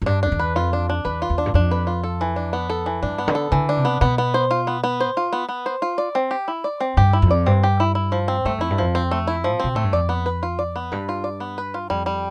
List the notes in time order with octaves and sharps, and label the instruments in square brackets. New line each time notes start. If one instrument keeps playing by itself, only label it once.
[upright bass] F2
[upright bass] G2 [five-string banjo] D4
[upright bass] F2 [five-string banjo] D4
[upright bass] E2
[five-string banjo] B4
[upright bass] F2 [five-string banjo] F4
[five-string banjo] D4
D4
[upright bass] E2 [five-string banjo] B4
[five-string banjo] F4
[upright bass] E2
[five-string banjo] D4
[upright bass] G2
[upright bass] F2 [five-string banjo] D4
[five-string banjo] B4
F4
A4
E3
D4
B3
A4
E3
[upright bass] G2 [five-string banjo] D4
[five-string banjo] B3
[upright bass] D3
[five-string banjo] A4
[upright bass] D3 [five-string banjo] E3
[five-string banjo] D4
[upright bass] C3
[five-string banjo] B3
[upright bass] B2 [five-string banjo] B3
[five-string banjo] B3
C5
F4
B3
B3
C5
F4
B3
B3
C5
F4
D5
C4
G4
E4
D5
C4
[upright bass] G2 [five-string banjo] G4
[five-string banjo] E4
[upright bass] F2
[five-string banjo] D5
[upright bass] G2 [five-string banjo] C4
[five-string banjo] G4
E4
E4
F3
C4
[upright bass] G2 [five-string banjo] A3
[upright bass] F2 [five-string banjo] E4
[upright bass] G2
[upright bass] F2 [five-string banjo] F3
[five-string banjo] C4
A3
E4
F3
[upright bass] C3
[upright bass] B2 [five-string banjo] C4
[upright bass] A2 [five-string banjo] A3
[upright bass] G2
[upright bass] F2 [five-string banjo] D5
[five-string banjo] B3
B4
F4
D5
B3
[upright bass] G2 [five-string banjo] B4
[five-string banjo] F4
D5
B3
B4
F4
[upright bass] F2 [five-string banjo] G3
[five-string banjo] G3